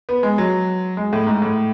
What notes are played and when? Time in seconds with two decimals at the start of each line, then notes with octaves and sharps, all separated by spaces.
0.09 B3
0.23 G#3
0.38 F#3
0.97 G#3
1.13 A2
1.27 G#2
1.42 A2